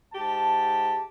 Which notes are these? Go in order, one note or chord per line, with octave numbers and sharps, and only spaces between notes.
G#2 G4 A5